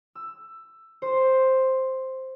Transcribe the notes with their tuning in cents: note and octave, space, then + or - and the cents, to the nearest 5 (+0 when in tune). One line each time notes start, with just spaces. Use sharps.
E6 +10
C5 +5